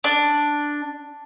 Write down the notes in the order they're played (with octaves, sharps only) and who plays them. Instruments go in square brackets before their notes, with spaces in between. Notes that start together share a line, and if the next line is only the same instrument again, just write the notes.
[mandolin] D4